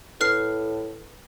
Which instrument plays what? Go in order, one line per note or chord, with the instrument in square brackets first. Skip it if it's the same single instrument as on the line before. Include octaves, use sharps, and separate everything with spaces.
[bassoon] A2 [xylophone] B4 F6 C7